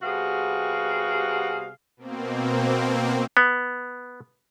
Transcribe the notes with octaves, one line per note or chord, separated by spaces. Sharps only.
C3 G3 B3 F#4 G#4 F5
B2 A#3 C4
B3